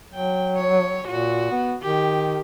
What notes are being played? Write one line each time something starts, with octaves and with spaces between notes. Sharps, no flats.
F#3 G5
C#5
A#2 F#4
B3
D#3 G4